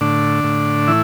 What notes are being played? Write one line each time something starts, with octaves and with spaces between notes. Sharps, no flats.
A2 D3 D4
A2
E3 E4